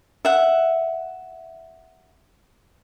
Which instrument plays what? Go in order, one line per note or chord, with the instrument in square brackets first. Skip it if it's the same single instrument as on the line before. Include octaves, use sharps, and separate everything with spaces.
[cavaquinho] E5 F#5